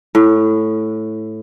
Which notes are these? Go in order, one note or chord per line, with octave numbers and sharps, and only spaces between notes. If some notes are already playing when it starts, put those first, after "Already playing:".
A2